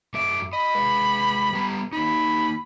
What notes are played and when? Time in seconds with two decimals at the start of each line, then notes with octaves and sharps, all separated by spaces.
0.14 F#2 A3 E5 D6
0.53 D#5 B5
0.75 G#3 B4
1.53 G3 B3 A#5
1.93 A#3 D#4 B5